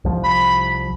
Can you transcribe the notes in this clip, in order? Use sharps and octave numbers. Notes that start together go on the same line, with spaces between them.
C2 F3
B5